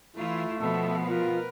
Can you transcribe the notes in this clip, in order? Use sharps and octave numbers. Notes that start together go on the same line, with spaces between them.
E3 A3 E4 F4
B2 F3 B3 A4 E5
F4 A#4 B4